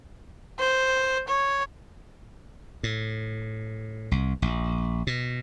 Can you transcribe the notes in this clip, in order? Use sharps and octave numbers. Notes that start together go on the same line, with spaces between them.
C5
C#5
A2
C2
A#1
B2